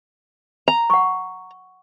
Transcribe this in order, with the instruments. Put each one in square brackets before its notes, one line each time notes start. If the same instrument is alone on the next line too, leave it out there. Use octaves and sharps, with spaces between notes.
[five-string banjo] A#5
[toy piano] F#5 C#6